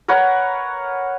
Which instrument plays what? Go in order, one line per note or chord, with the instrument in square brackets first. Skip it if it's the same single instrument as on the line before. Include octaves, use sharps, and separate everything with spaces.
[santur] A#4 B4 C#5 F#5